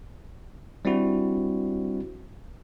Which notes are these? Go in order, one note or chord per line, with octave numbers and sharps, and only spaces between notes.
G3 C4 D4 E4 F#4